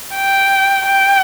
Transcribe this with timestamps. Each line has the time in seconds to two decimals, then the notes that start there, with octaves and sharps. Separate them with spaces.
0.15 G5
0.87 G5